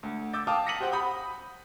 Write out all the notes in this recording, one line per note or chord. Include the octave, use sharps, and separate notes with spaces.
D2
D6 E6 G6 A6
F5 G5 A5 D6 D#6 F6
A#6 B6 C#7 D#7 F#7
F#4 G4 C5 F#5 G5
B5 D#6 G6